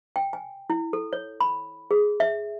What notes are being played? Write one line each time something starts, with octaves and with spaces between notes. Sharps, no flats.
G5
G#5
E4
A4
C#5
B5
G#4
E5